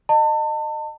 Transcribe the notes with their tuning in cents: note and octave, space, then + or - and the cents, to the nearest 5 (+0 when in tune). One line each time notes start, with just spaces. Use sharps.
D#5 -25 A5 +35